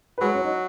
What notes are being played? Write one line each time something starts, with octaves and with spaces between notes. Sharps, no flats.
B4
F#3 G#3 G#4
C#4 C#5
D#4 D#5